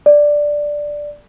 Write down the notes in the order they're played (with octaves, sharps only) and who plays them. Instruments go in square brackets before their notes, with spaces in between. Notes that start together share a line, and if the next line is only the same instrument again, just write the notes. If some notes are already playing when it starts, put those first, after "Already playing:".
[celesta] D5